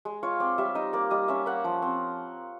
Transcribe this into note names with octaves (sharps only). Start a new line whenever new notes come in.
G#3
F4 C#5
C4 D5
G3 E5
D#4 D#5
A#3 D5
G3 D#5
C#4 E5
A#3 F#5
F3
C4